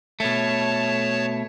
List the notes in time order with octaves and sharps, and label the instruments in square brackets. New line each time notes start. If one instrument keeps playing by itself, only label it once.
[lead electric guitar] B2 A3 [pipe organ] C#5 A5